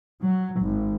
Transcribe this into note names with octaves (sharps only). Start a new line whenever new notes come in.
F#3
G#1